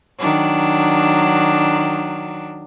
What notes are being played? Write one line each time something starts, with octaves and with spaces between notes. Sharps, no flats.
D#3 F#3 D4